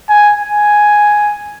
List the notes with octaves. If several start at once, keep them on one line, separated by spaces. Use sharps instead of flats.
G#5
G#5